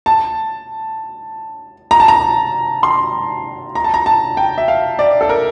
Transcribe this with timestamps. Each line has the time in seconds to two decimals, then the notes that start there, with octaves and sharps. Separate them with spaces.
0.06 A5
1.91 A#5
2.00 A5
2.08 A#5
2.83 C6
3.75 A#5
3.84 A5
3.94 A#5
4.06 A5
4.37 G5
4.58 E5
4.68 F5
4.99 D5
5.21 A4
5.29 A#4